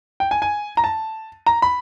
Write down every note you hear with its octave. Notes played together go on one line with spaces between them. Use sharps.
G5
G#5
G#5
A#5
A5
A#5
B5